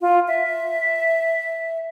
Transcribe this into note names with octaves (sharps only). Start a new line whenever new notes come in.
F4
E5